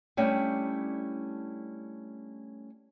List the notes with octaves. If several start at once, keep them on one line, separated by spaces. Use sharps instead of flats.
G3 A3 C#4 D4 E4 G5